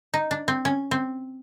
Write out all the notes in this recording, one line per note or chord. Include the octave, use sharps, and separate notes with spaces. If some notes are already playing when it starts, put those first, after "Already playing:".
D#4
D4
C4
C#4
C4